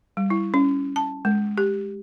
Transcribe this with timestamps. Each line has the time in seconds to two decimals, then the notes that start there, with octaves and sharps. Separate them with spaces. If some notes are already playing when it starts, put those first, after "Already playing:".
0.17 G3
0.30 E4
0.54 C#4
0.96 A5
1.25 G#3
1.58 G4